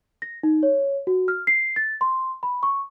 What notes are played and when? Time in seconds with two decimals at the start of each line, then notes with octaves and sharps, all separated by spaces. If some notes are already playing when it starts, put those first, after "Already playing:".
0.22 A#6
0.43 D#4
0.63 C#5
1.07 F#4
1.28 F6
1.47 C7
1.76 A6
2.01 C6
2.43 B5
2.63 C#6